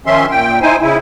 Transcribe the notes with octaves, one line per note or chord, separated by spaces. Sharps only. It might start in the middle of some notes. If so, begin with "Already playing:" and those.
D#3 F3 C#4 E5 C6
A#2 G5
D#4 E4 C5 G#5
C#3 E4